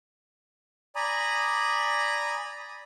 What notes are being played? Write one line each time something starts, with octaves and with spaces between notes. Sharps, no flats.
D5 G#5 A#5 B5 D#6